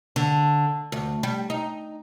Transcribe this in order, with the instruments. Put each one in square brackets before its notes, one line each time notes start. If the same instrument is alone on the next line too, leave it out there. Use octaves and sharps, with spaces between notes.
[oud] D3
D2
G3
D#4